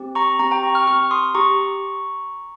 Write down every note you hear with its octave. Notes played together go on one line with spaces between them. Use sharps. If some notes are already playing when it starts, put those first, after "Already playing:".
Already playing: C4 G4
A#5 C#6
C4 G4 A#5 C#6
G5 A#5
A#5 C#6
C#6 F6
C4 G4 C#6 F6
C6 D#6
G4 A#5 C#6